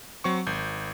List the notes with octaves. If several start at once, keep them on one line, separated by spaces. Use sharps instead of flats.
F#3 C4 C#6
G#1 G6